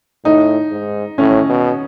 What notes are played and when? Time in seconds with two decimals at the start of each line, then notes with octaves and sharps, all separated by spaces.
0.25 A2 D#4
0.72 G#2
1.18 A2 C#4
1.49 B2